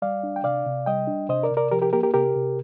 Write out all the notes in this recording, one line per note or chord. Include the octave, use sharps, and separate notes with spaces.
G3 D5 F5
D4
G5
C3 D5 F5
C3
G3 D#5 G5
D4
C3 C5 D#5
A#4 D5
C3
A#4 D5
F3 G4 A#4
G4 A#4
A#3 G4 A#4
G4 A#4
C3 G4 A#4
C3